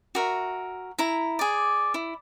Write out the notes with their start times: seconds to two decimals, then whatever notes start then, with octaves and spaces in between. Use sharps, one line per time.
0.15 F#4 A#4 E5
0.98 E4 A#5
1.39 G#4 D5
1.94 E4